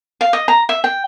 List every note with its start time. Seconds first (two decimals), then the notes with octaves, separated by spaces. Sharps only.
0.21 F5
0.33 D#5
0.48 A#5
0.69 E5
0.84 G5